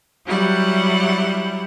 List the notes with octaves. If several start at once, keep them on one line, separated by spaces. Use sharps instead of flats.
F#3 G3 E4 F#5